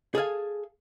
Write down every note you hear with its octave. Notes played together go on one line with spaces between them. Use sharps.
G#4 A4 F5 G#5